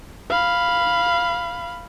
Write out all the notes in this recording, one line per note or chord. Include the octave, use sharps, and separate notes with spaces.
F5 B5